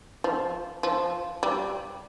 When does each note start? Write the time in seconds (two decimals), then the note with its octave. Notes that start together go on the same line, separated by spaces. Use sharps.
0.24 F3
0.83 F3
1.43 G3